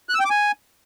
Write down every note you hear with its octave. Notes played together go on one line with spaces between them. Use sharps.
F#6
E6
G5
D6
G#5